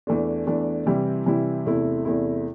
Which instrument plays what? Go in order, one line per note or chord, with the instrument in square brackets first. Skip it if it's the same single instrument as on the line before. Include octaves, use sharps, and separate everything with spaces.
[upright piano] E2 E3 A3 D4
E2 E3 A3 D4
C3 E3 G3 E4
C3 E3 G3 E4
E2 C3 A3 E4
E2 C3 A3 E4